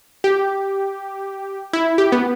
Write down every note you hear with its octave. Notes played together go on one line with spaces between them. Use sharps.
G4
E4
G4
B3